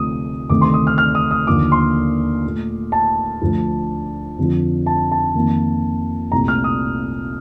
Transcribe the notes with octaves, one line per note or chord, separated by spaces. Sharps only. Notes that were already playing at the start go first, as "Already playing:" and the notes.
Already playing: D2 C3 F3 A3 D#6
D2 C3 D#3 A3 D6
C6
D#6
F6
F6
D#6
D#6
D#2 D3 F3 A#3 D6
C6
A#2 A3
A5
D2 D3 F3
F2 D3 F3
A5
A5
F2 D#3 A#3
C2 A#2 A3 A#5
F6
D#6